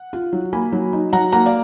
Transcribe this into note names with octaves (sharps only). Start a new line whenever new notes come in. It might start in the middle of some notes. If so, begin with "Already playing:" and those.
Already playing: F#5
F4
F#3
A#3 G#5 B5
F#3
D#4
F#3 F#5 A#5
A#3 F#5 A#5
D5 F5